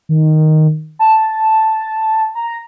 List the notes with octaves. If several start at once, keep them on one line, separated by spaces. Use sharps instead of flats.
D#3
A5
A#5